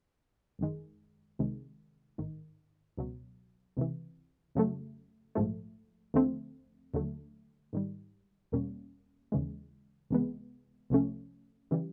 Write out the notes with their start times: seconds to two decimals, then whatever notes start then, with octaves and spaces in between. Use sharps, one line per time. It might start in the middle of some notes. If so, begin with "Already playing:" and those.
0.59 G1 F#2 D#3 G#3
1.39 C2 C3 D#3 G#3
2.18 A1 G#2 D#3
2.97 C#2 B2 F#3
3.77 C#2 C3 E3
4.55 F2 C#3 F#3 A3
5.35 A#1 G#2 F3 A3
6.14 D#2 D3 F3 A3 C4
6.94 D#2 D3 F#3 A3
7.73 G#2 D#3 G3
8.52 E2 B2 G3 A#3 C#4
9.32 D#2 C#3 E3 G#3
10.10 C#2 C3 E3 G#3 B3
10.90 C2 C3 F3 A3 C#4
11.71 C#3 E3 G3